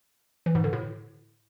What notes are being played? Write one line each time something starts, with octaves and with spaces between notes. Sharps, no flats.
E3
G#2
D3
A2